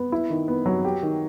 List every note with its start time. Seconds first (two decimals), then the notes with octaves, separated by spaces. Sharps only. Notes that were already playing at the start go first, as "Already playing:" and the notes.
Already playing: B3
0.12 E4
0.30 D#3
0.48 B3
0.66 F#3
0.85 G4
1.03 D#3